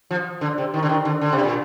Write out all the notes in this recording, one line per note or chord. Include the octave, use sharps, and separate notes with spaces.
F3
D3
C3
D#3
D3
D#3
D3
D3
C3
A#2